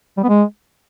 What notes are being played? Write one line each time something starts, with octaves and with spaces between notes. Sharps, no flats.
G3
B3
G#3